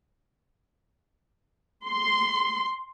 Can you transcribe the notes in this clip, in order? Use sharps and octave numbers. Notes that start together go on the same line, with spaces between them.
C6